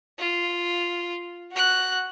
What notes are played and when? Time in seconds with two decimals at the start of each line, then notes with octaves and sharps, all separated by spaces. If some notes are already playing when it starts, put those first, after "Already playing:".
0.19 F4
1.52 F#4 F#6